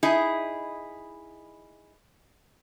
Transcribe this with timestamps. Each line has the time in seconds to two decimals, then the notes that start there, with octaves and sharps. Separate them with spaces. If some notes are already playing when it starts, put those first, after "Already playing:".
0.03 D#4 E4 G#4 D#5